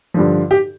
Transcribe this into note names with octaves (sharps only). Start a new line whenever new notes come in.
G2 D3 F3
G4